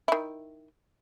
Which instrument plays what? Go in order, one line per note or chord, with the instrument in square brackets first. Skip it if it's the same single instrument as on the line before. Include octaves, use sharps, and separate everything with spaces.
[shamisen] D#3 E4